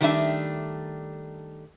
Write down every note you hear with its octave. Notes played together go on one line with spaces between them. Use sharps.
D#3 G3 A3 D4 E5